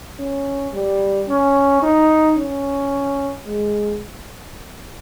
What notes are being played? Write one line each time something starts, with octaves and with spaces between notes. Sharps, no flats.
C#4
G3
C#4
D#4
C#4
G#3